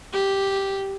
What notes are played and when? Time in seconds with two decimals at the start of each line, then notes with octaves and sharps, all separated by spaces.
0.13 G4